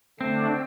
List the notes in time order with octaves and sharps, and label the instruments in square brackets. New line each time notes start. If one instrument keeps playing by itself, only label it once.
[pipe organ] D3 A3 D4 [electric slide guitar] C4